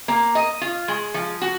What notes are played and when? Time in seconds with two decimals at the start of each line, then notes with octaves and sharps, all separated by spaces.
0.08 A#3
0.35 D#5
0.61 F4
0.88 G#3
1.14 F3
1.42 F#4